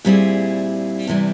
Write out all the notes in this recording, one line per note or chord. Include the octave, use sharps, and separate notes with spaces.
A#2 G3 C4 E4 G#4
E2 C3 E3 G3